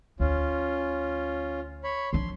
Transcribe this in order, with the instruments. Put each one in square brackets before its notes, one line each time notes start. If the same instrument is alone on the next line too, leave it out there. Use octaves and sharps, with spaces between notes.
[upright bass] D2 [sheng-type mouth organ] C#4 F4
[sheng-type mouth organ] C#5 B5
[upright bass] F3 D4 [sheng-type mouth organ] C6